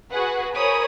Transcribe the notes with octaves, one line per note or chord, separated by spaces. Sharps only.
F#4 G#4 B4 F#5
G#4 A#4 C5 C#5 B5 D#6